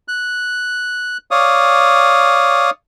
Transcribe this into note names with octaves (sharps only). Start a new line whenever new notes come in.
F#6
C#5 D5 F5 D#6